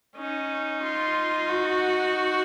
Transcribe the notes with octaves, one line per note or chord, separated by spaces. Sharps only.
C#4 D#4
F4
F#4